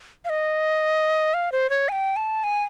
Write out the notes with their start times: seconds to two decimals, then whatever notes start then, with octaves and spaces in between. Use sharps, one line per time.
0.25 F5
0.29 D#5
1.34 F5
1.52 C5
1.70 C#5
1.89 G#5
1.92 G5
2.16 A5
2.44 G#5